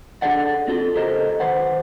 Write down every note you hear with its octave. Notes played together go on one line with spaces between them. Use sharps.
D4 E4 G#4 A4 D5 F#5
C4 F4 A4
C#2 G4 A4 A#4 C5 D#5
D#3 B4 C5 F#5